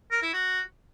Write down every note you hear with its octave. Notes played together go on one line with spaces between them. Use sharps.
A#4
E4
F#4